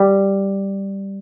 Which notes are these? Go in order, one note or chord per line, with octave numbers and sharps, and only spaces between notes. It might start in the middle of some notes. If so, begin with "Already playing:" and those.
Already playing: G3